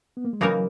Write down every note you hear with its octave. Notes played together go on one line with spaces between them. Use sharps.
B3
A#3
G#3
C#3 E3 F#3 A#3 D#4 A#4